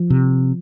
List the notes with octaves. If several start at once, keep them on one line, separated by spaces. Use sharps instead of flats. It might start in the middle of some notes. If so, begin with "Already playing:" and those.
Already playing: F3
C3